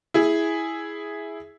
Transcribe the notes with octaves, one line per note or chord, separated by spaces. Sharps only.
E4 G#4